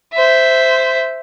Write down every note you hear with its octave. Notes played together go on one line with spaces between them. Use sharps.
C5 E5